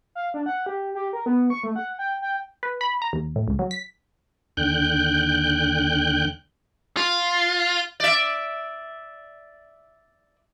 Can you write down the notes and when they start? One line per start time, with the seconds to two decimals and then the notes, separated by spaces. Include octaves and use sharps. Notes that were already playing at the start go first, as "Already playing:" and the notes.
0.15 F5
0.34 D4
0.46 F#5
0.66 G4
0.95 G4
1.13 A#4
1.26 B3
1.50 C#6
1.64 A3
1.76 F#5
1.99 G5
2.22 G5
2.63 B4
2.81 B5
3.02 A#5
3.13 D#2
3.36 A2
3.48 C#2
3.59 F#3
3.71 B6
4.57 D#2 D3 G5 F#6 G6
6.97 F4
8.00 D5 E5